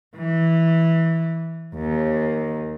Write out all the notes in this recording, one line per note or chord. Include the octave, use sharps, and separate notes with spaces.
E3
D#2